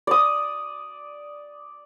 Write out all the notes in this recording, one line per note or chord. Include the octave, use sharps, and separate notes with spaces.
D5 D#6